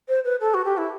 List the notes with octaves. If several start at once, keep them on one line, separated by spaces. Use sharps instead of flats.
C5
B4
A4
F#4
G4
E4